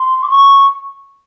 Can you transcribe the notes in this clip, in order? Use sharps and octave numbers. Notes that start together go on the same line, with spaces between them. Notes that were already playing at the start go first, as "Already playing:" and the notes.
Already playing: C6
D6
C#6